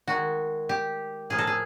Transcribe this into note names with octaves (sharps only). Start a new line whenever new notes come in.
D#3 G#3 F#4
G4
A2 F3 A#3 G#4
A4
G#4